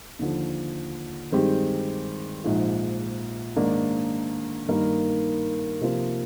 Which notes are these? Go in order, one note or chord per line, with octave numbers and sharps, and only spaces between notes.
D#2 D3 F3
G2 D#3 G#3 C4 G4
A#1 G#2 F3
G#2 D#3 A#3 D4
G2 D#3 A#3 D#4 A#4
C3 F3 A#3 F4 C5